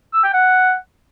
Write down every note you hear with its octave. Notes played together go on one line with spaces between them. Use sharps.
E6
G5
F#5